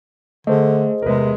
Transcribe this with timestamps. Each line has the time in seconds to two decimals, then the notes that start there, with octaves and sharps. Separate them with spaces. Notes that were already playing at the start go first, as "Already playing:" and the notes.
0.47 D3 A3 G#4 C5 D#5
1.03 E2 C3 G#3 A#4 B4